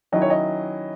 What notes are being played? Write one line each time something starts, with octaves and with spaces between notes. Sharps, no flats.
D#3 F#3 C#4 E4 D#5
C#5
D#5